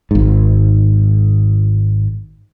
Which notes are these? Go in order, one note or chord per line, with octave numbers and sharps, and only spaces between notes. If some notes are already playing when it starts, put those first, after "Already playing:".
G#1 G#2